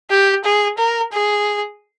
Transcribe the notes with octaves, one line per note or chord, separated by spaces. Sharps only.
G4
G#4
A#4
G#4